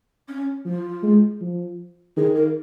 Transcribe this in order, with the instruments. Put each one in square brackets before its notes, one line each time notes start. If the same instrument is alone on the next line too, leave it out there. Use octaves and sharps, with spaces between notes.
[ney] C#4
[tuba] F3 [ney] F4
[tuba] G#3
F3
[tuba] D#3 [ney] G#4
[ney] A#4